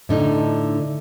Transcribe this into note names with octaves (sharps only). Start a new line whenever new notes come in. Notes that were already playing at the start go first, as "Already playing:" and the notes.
A2 D3 D#4